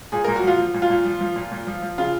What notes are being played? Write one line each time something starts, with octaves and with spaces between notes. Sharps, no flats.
A#2 G#4
A#2 A#4
F#4
F3 F4
F3
A#2
F4
A#2
F3
F3
A#2
A#2
F3
F3
C#3 F4